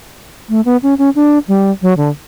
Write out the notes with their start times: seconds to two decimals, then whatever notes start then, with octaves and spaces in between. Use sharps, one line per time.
0.49 A3
0.65 B3
0.83 C#4
0.98 C#4
1.15 D4
1.48 G3
1.82 F#3
1.97 D3